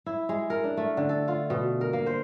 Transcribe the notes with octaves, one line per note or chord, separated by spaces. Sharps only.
E4
G#3
A#4
D4
A3
D3
A4
F4
B2
A#4
A#3
C5